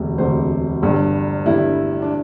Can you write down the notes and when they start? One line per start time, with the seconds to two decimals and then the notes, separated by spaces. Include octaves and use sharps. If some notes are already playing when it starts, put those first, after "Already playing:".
Already playing: E1 D2 C3
0.18 E1 D2 C3 C5
0.82 G1 G2 G3 G4
1.46 G1 G2 G3 E4
2.02 D4